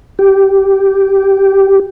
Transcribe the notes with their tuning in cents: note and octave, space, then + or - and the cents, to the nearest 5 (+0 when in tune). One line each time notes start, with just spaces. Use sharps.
G4 -10